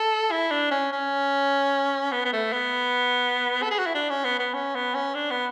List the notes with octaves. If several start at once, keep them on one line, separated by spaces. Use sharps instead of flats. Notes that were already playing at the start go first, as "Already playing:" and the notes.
Already playing: A4
E4
D4
C#4
C#4
B3
B3
A3
B3
A4
G#4
F#4
E4
D4
C#4
B3
B3
C#4
B3
C#4
D4
B3